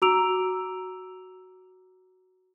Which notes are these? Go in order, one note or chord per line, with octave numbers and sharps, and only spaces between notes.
F#4 A#5 D6 E6 D7 F7